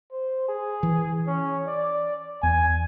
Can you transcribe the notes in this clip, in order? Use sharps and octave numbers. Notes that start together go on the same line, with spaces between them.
C5
G#4
E3
C#4
D5
E2 G#5